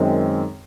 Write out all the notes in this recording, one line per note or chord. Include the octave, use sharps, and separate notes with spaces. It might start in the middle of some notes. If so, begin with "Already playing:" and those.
Already playing: F#2 D#3 G#3 C4